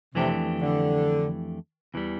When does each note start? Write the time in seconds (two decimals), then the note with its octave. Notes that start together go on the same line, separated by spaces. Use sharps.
0.15 F2 C3 E3 A3 D4 G4
0.60 D3
1.94 E2 E3 G3